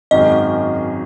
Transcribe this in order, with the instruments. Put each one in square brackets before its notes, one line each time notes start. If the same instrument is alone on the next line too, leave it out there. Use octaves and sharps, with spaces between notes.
[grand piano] G#1 F#2 D#3 G#3 [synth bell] D#5